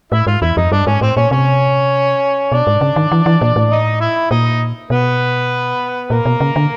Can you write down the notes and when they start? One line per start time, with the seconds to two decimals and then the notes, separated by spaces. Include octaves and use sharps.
0.12 A2 E4 E5
0.27 G#2 F4 F5
0.42 E2 E4 E5
0.57 F2 D#4 D#5
0.72 G2 D4 D5
0.87 G#2 C#4 C#5
1.01 A2 C4 C5
1.16 A#2 C#4 C#5
1.31 C3 C#4 C#5
2.51 B2 D4 D5
2.67 G#2
2.81 C#3
2.96 D#3
3.12 E3
3.26 E3
3.41 A#2
3.56 A2
3.71 D#4 D#5
4.01 E4 E5
4.30 A#2 D#4 D#5
4.90 B2 B3 B4
6.10 A#2 A#3 A#4
6.25 B2
6.40 C#3
6.56 D3